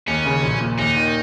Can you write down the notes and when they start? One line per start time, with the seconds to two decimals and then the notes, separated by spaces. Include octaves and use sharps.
0.08 D#2 C#4
0.26 C#3
0.43 A#1
0.60 A#2
0.79 D#2 D#4
0.96 D#3